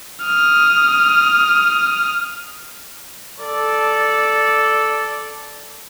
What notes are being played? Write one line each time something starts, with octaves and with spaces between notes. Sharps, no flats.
D#6 F6
A4 D5